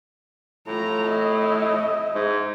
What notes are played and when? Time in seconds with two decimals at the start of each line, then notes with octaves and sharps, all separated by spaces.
0.67 A2 F4 A#5
1.09 D#5 E5
2.15 G#2